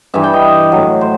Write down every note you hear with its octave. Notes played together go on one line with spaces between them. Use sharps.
G2 E3 G3 E5
G5
D#5
A2 F#3
C5